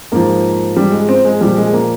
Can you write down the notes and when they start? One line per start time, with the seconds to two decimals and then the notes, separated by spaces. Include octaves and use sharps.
0.12 G#2 F3 A#3
0.77 G3
0.92 G#3
1.09 C4
1.25 G#3
1.41 A#2 F3 G3
1.57 G#3
1.73 A#3